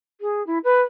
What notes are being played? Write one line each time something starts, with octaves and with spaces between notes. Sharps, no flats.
G#4
E4
B4